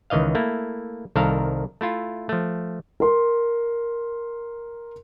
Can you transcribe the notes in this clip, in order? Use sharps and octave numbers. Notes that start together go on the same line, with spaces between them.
C#2 D#3 E3 D#5 F5
A3 A#3 E4
C2 D#3 A4 A#4 F5
A3 E4 F4
F3 A3
A#4 C6